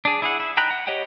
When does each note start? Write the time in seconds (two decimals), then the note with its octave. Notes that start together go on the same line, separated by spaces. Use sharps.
0.05 D4 G#4
0.22 E4 G#4 F#5
0.40 E4
0.57 D#4 G5 A#5 B5 F#6
0.71 F#5
0.87 G4 C#5 D#5 F#5 G5